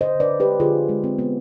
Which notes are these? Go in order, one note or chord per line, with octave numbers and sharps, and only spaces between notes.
D3 C5 D#5
D3 B4 D5
D3
G4 B4
G#3
D3 F4 G#4
C4
G#3
C4
B3